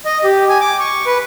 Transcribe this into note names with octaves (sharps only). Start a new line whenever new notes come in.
D#5
G4
G#5
D6
C#6
B4